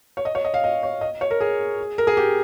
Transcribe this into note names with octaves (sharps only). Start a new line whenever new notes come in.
C#5
D#5
C#5
D#5
F5
D#5
C#5
D#5
C#5
A#4
G#4
A#4
G#4
G4